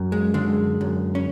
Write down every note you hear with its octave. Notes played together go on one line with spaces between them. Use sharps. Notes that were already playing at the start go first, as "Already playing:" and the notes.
Already playing: F#2
G#3
D3 G#3
F#2
C#4